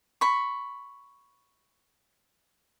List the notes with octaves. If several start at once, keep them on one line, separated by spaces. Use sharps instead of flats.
B5 C#6